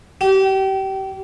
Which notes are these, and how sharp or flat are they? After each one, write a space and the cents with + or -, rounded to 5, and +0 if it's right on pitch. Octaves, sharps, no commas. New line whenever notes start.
G4 -30